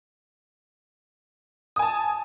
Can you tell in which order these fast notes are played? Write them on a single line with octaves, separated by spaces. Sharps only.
D#6 G#5 A5